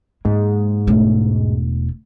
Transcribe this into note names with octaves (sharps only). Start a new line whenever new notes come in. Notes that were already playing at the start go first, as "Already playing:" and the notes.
G#2 A#3
E1 A3